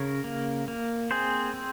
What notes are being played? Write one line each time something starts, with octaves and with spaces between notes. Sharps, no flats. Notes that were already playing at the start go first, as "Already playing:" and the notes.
Already playing: C#3 A#4 C#5
A#3
A#3
C4 G#4 C5
C4